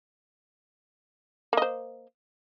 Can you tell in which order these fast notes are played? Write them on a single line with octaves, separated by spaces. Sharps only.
A#3 D#5 C5